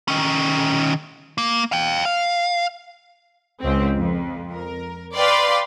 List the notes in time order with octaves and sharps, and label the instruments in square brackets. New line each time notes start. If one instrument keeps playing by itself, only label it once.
[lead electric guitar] D#3 C#4
A#3
F5 G5
F5
[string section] C#2 C4
F2
A#4
B4 D5 F5 G5 C6